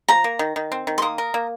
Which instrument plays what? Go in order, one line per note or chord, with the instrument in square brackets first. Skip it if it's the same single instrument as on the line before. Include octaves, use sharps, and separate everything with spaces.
[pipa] F3 [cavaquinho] A#5
[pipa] A#3
D#3
D#3
C4
D#3
[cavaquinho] C6
[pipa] A#3 [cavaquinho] D#6
[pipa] A#4
A#3